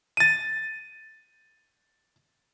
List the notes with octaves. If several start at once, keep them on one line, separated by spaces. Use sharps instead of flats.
A6 D#7